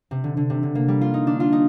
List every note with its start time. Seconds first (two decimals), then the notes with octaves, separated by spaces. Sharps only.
0.11 C3
0.24 D3
0.37 D3
0.50 C3
0.63 D3
0.75 A#3
0.88 G3
1.01 F4
1.14 D#4
1.27 D4
1.40 F4
1.52 D#4